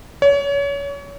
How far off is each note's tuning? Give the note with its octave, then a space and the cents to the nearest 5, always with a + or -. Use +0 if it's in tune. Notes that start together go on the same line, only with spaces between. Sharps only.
C#5 +30